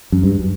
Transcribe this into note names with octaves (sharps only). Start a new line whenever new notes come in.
F#2
G2